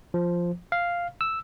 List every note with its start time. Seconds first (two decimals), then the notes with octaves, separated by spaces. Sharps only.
0.14 F3
0.72 F5
1.21 E6